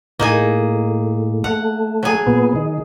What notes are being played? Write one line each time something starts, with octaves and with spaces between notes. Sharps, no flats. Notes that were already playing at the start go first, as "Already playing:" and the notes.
A2 A#3 D#4 G#4
A3 F#5
F#3 G#4
A#2 B3
D#3